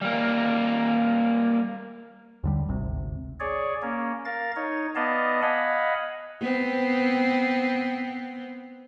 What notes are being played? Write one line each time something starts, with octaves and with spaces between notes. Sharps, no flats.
G3 A#3
D#2 D3 G3
G#1 D2 C3
G#4 C#5 D5
A#3 C#4
A#4 F5 A6
D#4 C#5
B3 D5 D#5 F5 A5
D#5 F5 F#5 G#5 B5
B3 C4